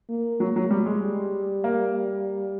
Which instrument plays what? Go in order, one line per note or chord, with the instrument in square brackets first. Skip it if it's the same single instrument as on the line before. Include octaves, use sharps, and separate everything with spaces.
[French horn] A#3
[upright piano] F#3
F#3
G3
G#3
[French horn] G3
[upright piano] A#3